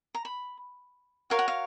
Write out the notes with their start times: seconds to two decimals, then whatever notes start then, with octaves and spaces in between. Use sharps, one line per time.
0.15 A#5
0.25 B5
1.30 F#4 A#4 C#5 F5
1.39 F#5
1.48 F5